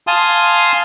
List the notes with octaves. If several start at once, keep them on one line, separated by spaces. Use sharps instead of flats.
F5 G#5 A5 C6 D#6